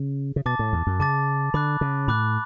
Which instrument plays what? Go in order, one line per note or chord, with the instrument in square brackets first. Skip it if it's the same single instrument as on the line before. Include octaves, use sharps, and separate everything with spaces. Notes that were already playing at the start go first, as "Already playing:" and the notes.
Already playing: [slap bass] C#3
C#3
[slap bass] B2 [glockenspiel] A5 D6 A6
[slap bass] A2
E2
F#2
[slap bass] C#3 [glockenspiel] A5 D6 A6
[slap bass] D3 [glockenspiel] B5 D6 F#6
[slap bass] C#3
[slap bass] A2 [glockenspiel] B5 D6 F#6